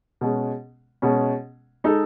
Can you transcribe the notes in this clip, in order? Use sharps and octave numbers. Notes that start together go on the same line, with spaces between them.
B2 G#3 C#4
B2 G#3 C#4
G#3 D#4 A4